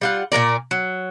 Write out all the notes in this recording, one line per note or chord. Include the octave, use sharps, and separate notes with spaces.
G3 F4 F#5
A#2 F#3 A#4 D5
F#3